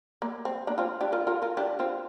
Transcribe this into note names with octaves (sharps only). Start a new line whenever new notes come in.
A#3
C4
A#3 D4
C4 F4
D4 G4
F4 A#4
F4 A#4
F4 A#4
D4 G4
C4 F4